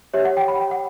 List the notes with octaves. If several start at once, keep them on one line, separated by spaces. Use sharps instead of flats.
G4 C#5 E5
F#5
G5
B5
G5
F#5